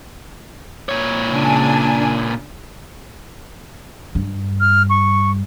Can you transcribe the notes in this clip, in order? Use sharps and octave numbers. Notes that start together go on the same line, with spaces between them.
A#2 C#5
C#3 D4 G#5
G2
F6
C#6